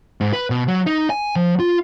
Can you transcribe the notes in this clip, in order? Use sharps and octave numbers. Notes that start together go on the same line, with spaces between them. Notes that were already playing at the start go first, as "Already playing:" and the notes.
G#2
B4
B2
F#3
D#4
G#5
F3
F4